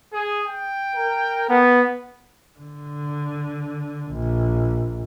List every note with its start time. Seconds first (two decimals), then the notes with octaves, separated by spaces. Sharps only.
0.13 G#4
0.45 G5
0.95 A#4
1.49 B3
2.59 D3
4.13 A#1